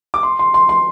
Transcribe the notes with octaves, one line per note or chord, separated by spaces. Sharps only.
D6
C6
C6
C6
C6